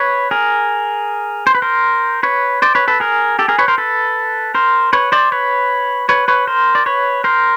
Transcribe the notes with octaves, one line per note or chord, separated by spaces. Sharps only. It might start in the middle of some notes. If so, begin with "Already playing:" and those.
Already playing: B4 C#5
G#4 A#4
C5
B4
A#4 C5
B4 C#5
C5 D5
B4 C#5
A4 B4
G#4 A#4
G4 A4
G#4 A#4
B4 C#5
A#4 C5
A4 B4
A#4 C5
B4 C#5
C5 D5
B4 C#5
B4 C#5
B4 C#5
A#4 C5
D5
B4 C#5
A#4 C5